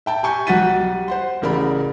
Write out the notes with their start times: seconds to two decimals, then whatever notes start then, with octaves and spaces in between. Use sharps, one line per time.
0.06 E5 G5 A5
0.23 G4 G#5 C#6 G6
0.47 B1 F#4 F#5 A6 B6 D#7
0.80 G3
1.08 C5 F#5 C6
1.42 A1 C#3 A#4 D5 B5